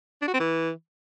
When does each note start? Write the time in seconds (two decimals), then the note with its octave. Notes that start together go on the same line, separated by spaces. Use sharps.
0.22 D4
0.28 F#4
0.34 C4
0.40 E3